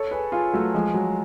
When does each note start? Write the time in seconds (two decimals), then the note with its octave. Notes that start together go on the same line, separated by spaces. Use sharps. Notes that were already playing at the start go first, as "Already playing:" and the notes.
Already playing: A4 C#5
0.11 G#4 B4
0.32 F4 G#4
0.53 F#3 A3
0.74 F3 G#3
0.94 F#3